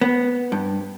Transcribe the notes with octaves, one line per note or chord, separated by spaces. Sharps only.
B3
G2